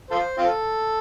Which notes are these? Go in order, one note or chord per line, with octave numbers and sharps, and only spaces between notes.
F4 A4 C5
C4 F4 A4